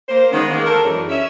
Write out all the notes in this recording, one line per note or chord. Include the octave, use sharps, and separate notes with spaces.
A#3 C5
D#3 G#3 B3 C#4
D#3 G#3 A#3
A4 A#4
F#2 E3 G#3 D4 C#5
C#4 E5